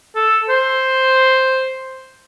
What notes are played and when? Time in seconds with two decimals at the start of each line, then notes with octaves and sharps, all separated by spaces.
0.15 A4
0.49 C5